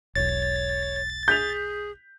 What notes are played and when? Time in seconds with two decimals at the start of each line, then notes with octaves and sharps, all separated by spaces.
0.15 E1 B1 C#5 A6
1.28 G#4 G6 B6 F7